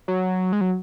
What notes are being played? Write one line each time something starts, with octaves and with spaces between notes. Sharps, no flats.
F#3
G#3
F#3